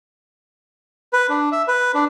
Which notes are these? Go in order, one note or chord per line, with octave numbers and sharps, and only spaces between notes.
B4
D4
E5
B4
D4